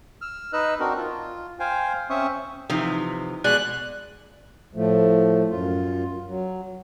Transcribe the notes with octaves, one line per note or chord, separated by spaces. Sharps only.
E6 F6
D#4 B4 D#5 E6 F#6
C4 D4 D#4 F#4 A#4
F4
C5 F5 G5 G#5
C4 C#4 C5 E5 C#6 D#6
C3 E3 F3 D#4
B2 G#3 D5 F#6
A2 F3 A3
F#2 F4
F#3